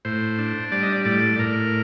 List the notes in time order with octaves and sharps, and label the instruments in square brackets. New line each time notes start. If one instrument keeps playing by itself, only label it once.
[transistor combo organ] A2 C5
D4
G3 D5
D#5
D5
A2 D5
A2 A#4